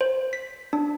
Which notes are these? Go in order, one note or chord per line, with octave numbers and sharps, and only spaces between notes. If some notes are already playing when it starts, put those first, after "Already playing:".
C5
B6
D4